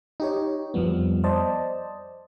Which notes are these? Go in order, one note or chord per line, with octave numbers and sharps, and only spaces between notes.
D#4 G4 C#5
F2 F3 G3 B3
C5 D5 D#5 A5